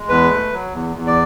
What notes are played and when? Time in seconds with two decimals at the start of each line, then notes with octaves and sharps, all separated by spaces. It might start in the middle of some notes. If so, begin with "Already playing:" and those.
Already playing: G#3
0.09 E2 B4
0.30 A3
0.53 F#3
0.74 E2
0.97 E2
1.07 D5